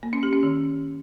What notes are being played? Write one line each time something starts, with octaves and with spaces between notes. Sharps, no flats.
A#3
C#4
G4
C#4
D#3